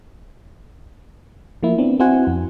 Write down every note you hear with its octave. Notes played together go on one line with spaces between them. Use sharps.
F3 A#3 E4
B3 C4 D4
C4 E4 F#4 C5 F#5 G#5
F2